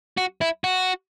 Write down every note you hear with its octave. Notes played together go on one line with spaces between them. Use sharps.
F#4
E4
F#4